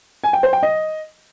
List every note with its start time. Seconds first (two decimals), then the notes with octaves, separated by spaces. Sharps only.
0.24 G#5
0.33 G5
0.43 C5
0.53 G5
0.63 D#5